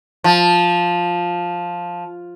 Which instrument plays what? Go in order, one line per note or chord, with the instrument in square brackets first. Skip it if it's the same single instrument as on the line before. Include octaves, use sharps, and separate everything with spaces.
[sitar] F3